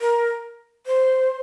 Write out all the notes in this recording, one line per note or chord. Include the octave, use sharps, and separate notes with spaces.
A#4
C5